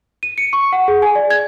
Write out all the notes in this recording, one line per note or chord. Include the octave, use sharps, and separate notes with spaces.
D#7
C#7
C#6
F#5
G#4
G#5
D5
G#6